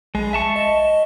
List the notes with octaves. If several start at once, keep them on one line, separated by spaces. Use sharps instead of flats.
A#1 G#3
E5 A5 C#6
D#5